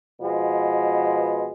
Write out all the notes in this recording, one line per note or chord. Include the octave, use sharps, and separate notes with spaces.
B2 F3 G#3 B3